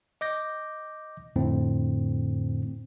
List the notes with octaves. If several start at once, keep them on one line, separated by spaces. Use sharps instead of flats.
D#5 D6 G6 A#6
F2 A2 D3 C4